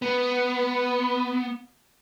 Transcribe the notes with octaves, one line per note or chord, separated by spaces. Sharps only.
B3